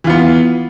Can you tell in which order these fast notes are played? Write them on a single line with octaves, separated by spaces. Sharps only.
E3 F4 B3